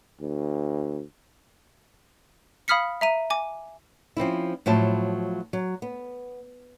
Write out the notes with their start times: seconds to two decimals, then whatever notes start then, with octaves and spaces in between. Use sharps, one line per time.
0.21 D2
2.68 F5 B5 D#6 F6 B6 C#7
3.01 E5 A#5 D#7
3.30 G#5 D6
4.17 F3 C4 C#4 E4
4.66 A2 F3 F#3 E4 A5
5.53 F#3
5.82 B3